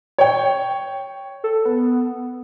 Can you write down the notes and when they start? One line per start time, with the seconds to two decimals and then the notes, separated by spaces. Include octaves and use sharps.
0.18 C#5 G5
1.44 A4
1.65 B3